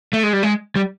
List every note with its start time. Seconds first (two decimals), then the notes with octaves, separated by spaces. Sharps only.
0.13 A3
0.23 G#3
0.33 G3
0.43 G#3
0.76 G3